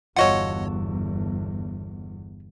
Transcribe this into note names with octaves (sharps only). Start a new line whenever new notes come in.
G1 E2 F4 F#4 A4 C#5 D#5 F#5